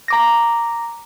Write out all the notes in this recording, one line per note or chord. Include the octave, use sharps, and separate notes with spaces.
A#5 D6 A#6